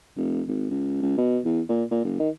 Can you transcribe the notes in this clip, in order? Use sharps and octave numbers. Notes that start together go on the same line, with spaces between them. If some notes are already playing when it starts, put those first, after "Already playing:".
F1
G#1
C#2
C#2
B2
E2
A#2
A#2
F#1
D#3